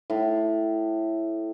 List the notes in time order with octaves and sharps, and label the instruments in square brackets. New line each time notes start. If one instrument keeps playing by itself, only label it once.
[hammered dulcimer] A2